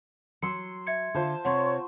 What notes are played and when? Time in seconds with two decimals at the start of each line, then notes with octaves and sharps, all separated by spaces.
0.42 F#3 C6 E6 C#7
0.87 E5 G#6 C#7
1.14 D3 F4 C5 F5 A5
1.45 C3 C4 C#5 F#5 C6 C#6